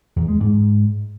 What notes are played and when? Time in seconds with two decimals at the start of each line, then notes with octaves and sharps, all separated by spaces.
0.16 E2
0.28 G#3
0.40 G#2